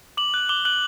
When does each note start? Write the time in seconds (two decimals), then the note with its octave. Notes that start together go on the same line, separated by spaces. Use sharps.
0.17 D6 F#7
0.34 F#6
0.49 D6 G7
0.65 F#6 F#7